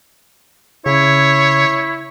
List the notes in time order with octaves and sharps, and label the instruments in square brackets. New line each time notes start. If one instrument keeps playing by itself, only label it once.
[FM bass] C#3 [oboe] E4 [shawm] C#5